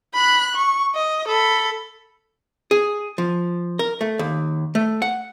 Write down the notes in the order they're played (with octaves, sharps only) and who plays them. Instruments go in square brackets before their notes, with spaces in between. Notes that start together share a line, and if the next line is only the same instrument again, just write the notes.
[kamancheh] B5 F#6
C#6
D#5
A4 B5
[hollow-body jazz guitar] G#4
F3
A#4
A3
D#2
A3
F#5